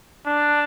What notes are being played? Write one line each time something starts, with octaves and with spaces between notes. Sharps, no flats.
D4